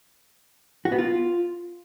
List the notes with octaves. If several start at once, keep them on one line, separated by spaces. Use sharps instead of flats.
F#4
B3
F4